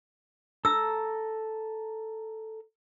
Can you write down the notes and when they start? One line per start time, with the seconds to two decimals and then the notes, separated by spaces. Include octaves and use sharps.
0.65 A4 A#5 E6